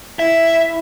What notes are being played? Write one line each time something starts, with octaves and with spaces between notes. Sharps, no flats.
E4 E5